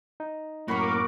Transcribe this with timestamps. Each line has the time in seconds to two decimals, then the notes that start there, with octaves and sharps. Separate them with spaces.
0.20 D#4
0.68 F#2 A2 A#3 F#4 A#4 B5 C#6 D6